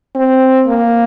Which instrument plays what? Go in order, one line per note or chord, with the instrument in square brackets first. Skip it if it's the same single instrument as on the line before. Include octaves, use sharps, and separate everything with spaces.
[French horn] C4
A#3